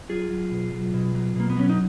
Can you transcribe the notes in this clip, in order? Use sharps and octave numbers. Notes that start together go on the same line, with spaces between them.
F#3 F4 G#4
F#3
B2
F#3
B2
F#3
B2 A#3
B3
F#3 C#4
D#4